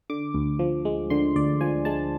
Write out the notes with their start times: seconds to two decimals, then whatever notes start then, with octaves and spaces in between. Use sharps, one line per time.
0.10 D3 D6
0.34 D2
0.59 F3
0.85 G#3
1.10 D3 C6
1.36 D2 D5
1.61 F3 G#5
1.85 G#3 A5